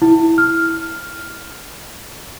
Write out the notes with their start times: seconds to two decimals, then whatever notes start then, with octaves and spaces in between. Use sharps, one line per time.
0.02 E4
0.38 F6